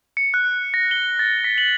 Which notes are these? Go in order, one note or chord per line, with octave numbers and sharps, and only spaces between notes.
C#7
F#6
A#6
G7
A6
B6
F#7